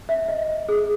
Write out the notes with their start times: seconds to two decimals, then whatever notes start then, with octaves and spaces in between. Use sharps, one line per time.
0.09 E5
0.28 D#5
0.69 G#4